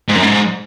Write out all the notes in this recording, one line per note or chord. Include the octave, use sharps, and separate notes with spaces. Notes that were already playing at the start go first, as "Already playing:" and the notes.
G#2
F#2
G#2